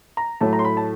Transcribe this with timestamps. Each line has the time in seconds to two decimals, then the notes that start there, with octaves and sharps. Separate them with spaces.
0.17 A#5
0.41 A2 F#3 A3 A5
0.53 A#5
0.59 C6
0.65 B5
0.77 A5